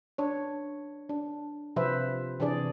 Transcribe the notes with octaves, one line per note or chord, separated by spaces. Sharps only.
D4 C#5
D4
C3 F3 B4 C5 E5
C3 E3 D4 G#4 D5